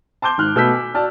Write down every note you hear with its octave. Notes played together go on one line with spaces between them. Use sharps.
A5 C6 D6 G6 G7
G#1 F6 F#6
B2 A3 E6 G6 B6
G#5
F#4 D5 A5 F6